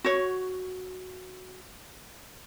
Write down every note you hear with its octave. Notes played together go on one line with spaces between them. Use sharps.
F#4 C#5